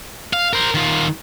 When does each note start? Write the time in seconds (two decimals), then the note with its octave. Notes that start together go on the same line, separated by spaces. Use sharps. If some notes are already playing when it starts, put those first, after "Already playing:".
0.33 F5
0.53 A#4 C5
0.74 D#3 F4